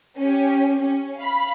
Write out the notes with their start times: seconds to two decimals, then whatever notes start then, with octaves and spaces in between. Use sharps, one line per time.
0.18 C#4 G4
0.80 C#4
1.17 F5 B5